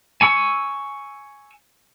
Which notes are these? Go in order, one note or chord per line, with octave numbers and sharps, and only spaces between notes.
G#5 C#6 E6